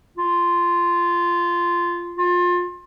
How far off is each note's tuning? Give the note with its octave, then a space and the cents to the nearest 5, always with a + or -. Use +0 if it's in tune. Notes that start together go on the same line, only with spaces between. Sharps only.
F4 -10
F4 +25